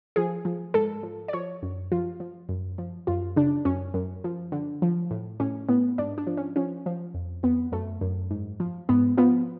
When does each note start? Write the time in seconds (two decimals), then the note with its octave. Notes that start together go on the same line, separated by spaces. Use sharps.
0.16 F3 G#4
0.45 F3
0.74 G#2 A4
1.03 F3
1.28 D5
1.33 F3 C#5
1.63 F#2
1.92 F3 F4
2.20 F3
2.49 F#2
2.78 F3
3.07 F#2 F4
3.36 C#3 D4
3.65 F#2 C#4
3.94 F#2
4.24 F3
4.52 D3
4.82 F3
5.11 A2
5.40 A2 C#4
5.68 A2 B3
5.98 G#2 D4
6.18 D4
6.27 F3
6.37 C#4
6.56 F3 C#4
6.86 F3
7.14 F2
7.43 F2 B3
7.72 F#2 A3
8.01 F#2
8.31 G#2
8.60 F3
8.89 G#2 B3
9.17 F3 B3